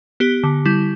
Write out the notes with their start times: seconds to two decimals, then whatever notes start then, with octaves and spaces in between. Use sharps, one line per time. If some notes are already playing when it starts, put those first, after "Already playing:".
0.20 B3 G4
0.43 D3
0.65 G3 E4